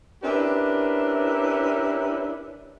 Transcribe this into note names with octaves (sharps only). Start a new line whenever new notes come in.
C#4 D4 E4 G4 A#4 B4